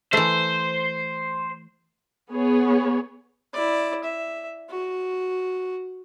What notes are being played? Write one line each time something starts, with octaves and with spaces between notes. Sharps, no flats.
E3 A3 C5
B3 G#4 C#5
E4 D5
E5
F#4